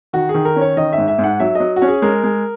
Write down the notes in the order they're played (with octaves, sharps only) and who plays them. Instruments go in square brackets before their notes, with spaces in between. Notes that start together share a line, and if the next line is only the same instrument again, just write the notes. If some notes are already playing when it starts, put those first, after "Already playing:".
[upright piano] D#3 [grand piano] F#4
[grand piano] G#4
[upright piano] D#3
[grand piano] A#4
[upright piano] C#4
[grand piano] C#5
[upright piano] D#3 [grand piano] D#5
[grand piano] E5
[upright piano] G#2
[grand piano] E5
[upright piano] G#2
[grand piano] F#5
[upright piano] F#3 [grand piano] E5
[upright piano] F#3 [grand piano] D#5
[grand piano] F#4
[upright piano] C#4
[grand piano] G#4
[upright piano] G#3 [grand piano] A#4
[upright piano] G#3